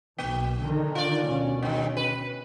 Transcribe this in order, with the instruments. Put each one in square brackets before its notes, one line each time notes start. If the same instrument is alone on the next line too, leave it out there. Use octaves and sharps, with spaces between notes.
[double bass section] B1 [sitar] A#3
[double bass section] D3 D#3
[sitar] F4 D5
[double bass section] D2 B2 C#4
[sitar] G2 D#3
B4